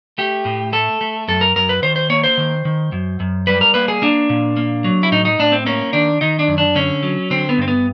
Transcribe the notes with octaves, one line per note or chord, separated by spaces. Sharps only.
A3 G4
A2
A3 A4
A3
F#2 A4
A#4
F#2 A#4
B4
D#3 C5
C5
A#3 C#5
C5
D#3
D#3
F#2
F#2
G3 B4
A#4
A#3 B4
G#4
A#3 D4
A#2
A#3
F#3
E4
A2 D#4
D#4
A2 D4
C4
A#3 C#4
D#3 D4
D#3 D#4
D4
F#2
D4
D3 C#4
F#3
D3 C4
B3
G2 C4
B3